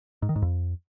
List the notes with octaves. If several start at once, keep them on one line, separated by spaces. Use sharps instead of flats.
G#2
D#3
G#2
F2